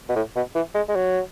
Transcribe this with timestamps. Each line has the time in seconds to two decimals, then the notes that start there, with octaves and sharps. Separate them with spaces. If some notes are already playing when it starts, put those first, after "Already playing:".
0.09 B2
0.16 A2
0.36 B2
0.55 E3
0.75 G#3
0.89 G#3
0.95 F#3